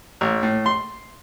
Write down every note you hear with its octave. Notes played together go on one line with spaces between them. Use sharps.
A1
A2
C6